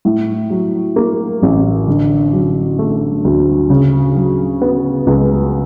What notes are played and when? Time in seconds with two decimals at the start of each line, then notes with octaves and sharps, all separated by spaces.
0.05 A2
0.50 F#3
0.96 A#3
1.42 A1
1.87 D3
2.33 F#3
2.79 A3
3.24 D2
3.70 C#3
4.15 F#3
4.62 B3
5.07 C#2